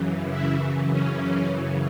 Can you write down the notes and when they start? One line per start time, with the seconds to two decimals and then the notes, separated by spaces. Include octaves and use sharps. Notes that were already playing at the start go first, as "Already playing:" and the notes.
Already playing: F#2 C#3 E3
0.32 E4
0.91 C#4